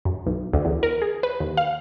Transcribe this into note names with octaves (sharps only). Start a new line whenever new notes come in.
F#2
B1
D2
E2
A#4
G#4
B4
D#2
F5